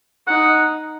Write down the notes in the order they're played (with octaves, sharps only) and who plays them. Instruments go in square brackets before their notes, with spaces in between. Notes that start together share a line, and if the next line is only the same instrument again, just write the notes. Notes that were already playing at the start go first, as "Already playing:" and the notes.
[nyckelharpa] D#4 [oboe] F#5